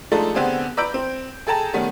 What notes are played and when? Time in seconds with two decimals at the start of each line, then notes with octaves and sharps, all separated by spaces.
0.12 F3 G#3 A3 D4 D#4 A4
0.35 D3 B3 C4 D4 G4 G#4
0.77 B4 D5 A#5 E6 G6 D7
0.94 C4
1.47 G#4 A4 G5 A5 A#5
1.73 D#3 G3 A3 B3 C#4